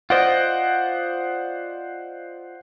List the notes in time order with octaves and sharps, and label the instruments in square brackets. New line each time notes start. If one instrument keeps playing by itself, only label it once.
[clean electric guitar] F4 D5 D#5 [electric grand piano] C5 F#5